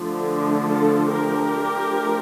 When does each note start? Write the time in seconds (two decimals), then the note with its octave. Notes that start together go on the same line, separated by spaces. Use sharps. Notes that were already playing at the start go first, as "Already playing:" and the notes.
Already playing: D3 F3 A3 D4
0.67 F4 A4
1.11 G4 A#4
1.56 F3 A3 D4